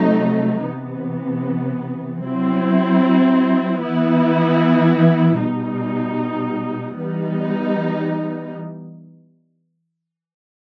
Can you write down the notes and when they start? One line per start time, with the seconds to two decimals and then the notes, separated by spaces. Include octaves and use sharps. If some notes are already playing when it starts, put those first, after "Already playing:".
Already playing: C3 F#3 A3 D#4
0.67 C3 E3 B3
2.25 F#3 C4 E4
3.83 E3 B3 E4
5.40 B2 G3 D#4
6.98 E3 G3 B3 D#4